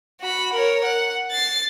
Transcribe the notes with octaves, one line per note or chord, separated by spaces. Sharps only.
F#4 B5
A#4 C#5
F#5
A6 C7